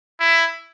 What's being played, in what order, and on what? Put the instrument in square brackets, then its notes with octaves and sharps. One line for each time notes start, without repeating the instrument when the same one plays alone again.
[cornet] E4